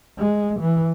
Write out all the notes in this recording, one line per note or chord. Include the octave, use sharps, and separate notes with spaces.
G#3
E3